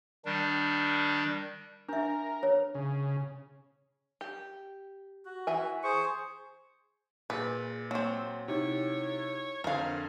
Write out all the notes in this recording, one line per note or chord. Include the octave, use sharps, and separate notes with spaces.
D#3 G3 D4
D4 A#4 E5
C#5
C#3
G4
F#4
E3 E5 G#5
G#4 C5 C#6
A#2 G#4 B4 G6
F#3 A#3 C4
C3 D#4 E4 G4 C#5
F2 D3 C4 A#4 F5